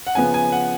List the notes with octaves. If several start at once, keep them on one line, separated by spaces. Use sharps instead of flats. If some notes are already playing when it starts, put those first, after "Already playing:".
F#5
C#3 F3 B3 G#5
G#5
F#5